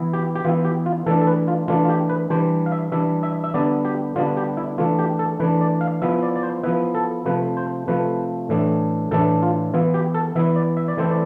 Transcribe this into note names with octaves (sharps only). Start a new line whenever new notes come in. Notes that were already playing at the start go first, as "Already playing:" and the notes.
Already playing: E3 B3 E4
G4
G4
E3 B3 E4 F4
G4
F4
E3 A3 D4 A4
A4
B4
F4
E3 A3 D4 F4
F4
G4
B4
E3 G3 D4 C5
F5
E5
E3 G3 D4 E5
E5
E5
D3 G3 B3 D4 D5
G4
D3 G3 B3 D4 F4
G4
E4
E3 A3 D4 F4
G4
A4
E3 A3 D4 B4
D5
F5
F3 B3 E4 E5
D5
D5
C5
F3 B3 E4 B4
A4
C3 F3 A3 B4
C5
C3 F3 A3 B4
A2 E3 A3 D4
A2 E3 A3 D4 A4
F4
E3 B3 E4 F4
G4
A4
E3 B3 E4 E5
D5
E5
D5
E3 A3 C4 E4 C5
D5